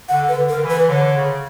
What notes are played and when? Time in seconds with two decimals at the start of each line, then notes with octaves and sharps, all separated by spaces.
0.09 D3 F#5
0.29 B4
0.36 D3
0.49 A#4
0.55 D3
0.62 E3
0.70 B4
0.89 D3 C#5
1.16 C#3